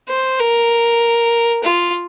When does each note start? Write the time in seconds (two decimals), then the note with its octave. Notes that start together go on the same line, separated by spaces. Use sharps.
0.08 C5
0.40 A#4
1.64 F4